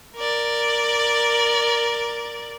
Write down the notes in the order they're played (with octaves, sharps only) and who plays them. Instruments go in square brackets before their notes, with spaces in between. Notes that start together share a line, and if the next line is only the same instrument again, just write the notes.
[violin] A#4 D5